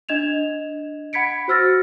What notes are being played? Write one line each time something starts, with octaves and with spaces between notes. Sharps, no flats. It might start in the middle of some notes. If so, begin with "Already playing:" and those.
D4 D#5 G#6 E7 F7
F#5 B5 G#6 B6 C#7 D7
F#4 C5 E6 F6 A6 A#6